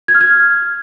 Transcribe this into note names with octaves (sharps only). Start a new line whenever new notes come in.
G#6
F6
G#6